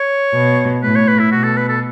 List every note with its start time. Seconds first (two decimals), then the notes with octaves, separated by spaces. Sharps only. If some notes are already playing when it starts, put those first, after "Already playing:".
Already playing: C#5
0.33 B2
0.82 A2 B4
0.95 C#5
1.08 B4
1.19 E4
1.32 B2 F#4
1.44 A4
1.57 B4
1.69 A4